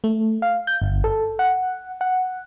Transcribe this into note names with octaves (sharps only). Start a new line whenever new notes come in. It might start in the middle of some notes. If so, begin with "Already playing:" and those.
A3
F5
G6
G1
A4
F#5
F#5